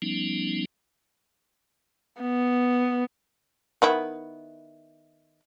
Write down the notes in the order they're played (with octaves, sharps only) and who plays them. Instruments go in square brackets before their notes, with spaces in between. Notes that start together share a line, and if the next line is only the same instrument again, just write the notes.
[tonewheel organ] F3 G3 B3 C#4 D#4
[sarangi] B3
[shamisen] D#3 B3 E4